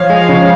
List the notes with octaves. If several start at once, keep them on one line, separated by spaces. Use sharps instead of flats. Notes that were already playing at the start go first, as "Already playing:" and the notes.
Already playing: F3 C#5 F5
G#3
C#3